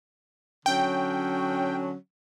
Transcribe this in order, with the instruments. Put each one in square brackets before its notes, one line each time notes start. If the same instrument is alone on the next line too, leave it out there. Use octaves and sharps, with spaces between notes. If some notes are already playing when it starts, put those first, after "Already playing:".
[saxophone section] D3 F#3 C#4 [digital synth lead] G5